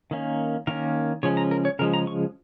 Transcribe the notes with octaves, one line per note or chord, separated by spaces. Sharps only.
D#3 A#3 C#4
D#3 A#3 C#4 A#4
C#3 F3 G#3 C#4 C#5
A#5
A#4
C#5
C#3 F3 G#3 C#4 A#4
A#5
C#6